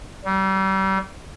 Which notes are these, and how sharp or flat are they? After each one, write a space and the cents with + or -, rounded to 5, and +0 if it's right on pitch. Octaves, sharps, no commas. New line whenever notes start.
G3 -35